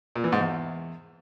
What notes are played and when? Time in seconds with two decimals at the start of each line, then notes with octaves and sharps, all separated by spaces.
0.16 A#2
0.24 E3
0.32 G#2
0.41 E2